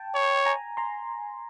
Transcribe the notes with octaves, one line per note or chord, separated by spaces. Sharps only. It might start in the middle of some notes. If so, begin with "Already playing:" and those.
Already playing: G5 A5
C#5
G#5 A#5
A#5 C6